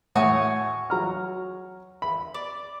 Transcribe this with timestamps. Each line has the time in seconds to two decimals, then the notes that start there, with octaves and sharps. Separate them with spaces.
0.16 A2 A3 F#4 C#5 G#5 D#6
0.90 F#3 A#5 F6
2.02 B5
2.34 D5